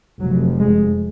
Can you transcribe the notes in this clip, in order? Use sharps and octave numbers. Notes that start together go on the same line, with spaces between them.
F1 F2 F#3
G#3